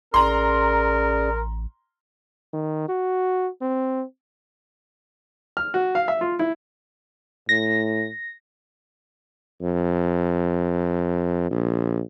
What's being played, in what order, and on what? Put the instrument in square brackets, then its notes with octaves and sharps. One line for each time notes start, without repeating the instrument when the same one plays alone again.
[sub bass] A1 [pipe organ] C#4 G#4 D5 [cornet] A#4 [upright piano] A#5 C6
[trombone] D#3
F#4
C4
[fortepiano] F6
F#4
F5
E5
F4
E4
[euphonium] A2 [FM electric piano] A#6
[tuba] F2
A#1